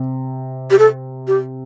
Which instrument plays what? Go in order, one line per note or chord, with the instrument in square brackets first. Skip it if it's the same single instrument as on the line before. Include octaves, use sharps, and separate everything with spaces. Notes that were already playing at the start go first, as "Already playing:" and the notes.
Already playing: [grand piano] C3
[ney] G4
A4
G4